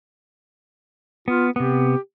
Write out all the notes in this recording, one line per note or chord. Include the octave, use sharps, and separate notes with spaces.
B3 F4
C3 B3 G4